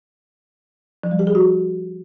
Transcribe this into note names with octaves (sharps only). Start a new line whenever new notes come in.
F3
G3
G4
G#4
F#4